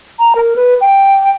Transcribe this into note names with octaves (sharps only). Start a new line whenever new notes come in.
A#5
A#4
B4
G5